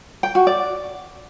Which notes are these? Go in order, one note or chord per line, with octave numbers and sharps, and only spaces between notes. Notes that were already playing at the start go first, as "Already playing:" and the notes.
G5
F#4
D5